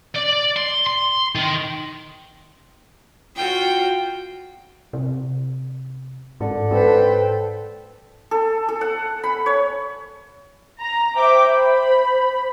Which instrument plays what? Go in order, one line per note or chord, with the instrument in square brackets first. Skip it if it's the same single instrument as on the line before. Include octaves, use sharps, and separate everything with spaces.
[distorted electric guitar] D5
C6
C6
D#3
[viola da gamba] F4 F#4 [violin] G5
[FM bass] C3
[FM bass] G#2 [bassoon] D3
[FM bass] G#2 [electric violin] A4 [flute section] B4 C5 G5
[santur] A4
A4
F#5
B5
C#5
[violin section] A#5
[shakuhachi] C5 [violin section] E5 G5 D6
[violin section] B5